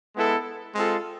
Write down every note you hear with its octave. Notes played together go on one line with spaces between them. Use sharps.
G#3 B3 E4 A4
G#3 C4 F4 A4